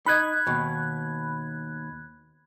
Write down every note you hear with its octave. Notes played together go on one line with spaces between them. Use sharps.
D#4 D#5 B5 F#6 G#6
D#2 B2